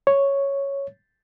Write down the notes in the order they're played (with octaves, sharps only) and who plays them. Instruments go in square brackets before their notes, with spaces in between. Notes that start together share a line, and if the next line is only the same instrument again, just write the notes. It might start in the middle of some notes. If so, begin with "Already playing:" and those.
[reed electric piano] C#5